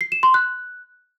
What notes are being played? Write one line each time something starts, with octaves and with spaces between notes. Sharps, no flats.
C7
E7
C6
F#6